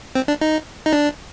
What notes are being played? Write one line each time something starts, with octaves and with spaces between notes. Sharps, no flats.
C4
D4
D#4
D#4
D4